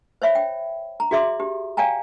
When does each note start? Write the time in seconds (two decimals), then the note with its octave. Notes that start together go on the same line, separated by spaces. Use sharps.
0.22 C5 C#5 E5 B5
0.35 G5
1.00 A#5
1.11 F#4 G#4 D5 E5 C6 D6
1.40 G4
1.77 D5 F5 G5 G#5 A#5